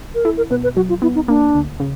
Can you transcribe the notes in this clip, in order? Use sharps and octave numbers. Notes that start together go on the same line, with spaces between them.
A#4
E4 A4
A#4
B2 B4
B4
F#3 F#4
F4
B3 E4
D#4
A#3 D4
D2
C#3